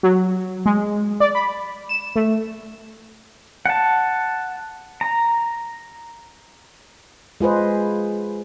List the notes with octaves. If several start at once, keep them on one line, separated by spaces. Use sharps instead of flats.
F#3
G#3
D5
B5
E7
A3
F#5 A5
A#5
G#3 F4 G#4 B4 C5 D#5